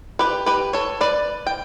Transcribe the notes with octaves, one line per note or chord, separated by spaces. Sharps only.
G4 B4
G4 B4
A4 C#5
B4 D5
G5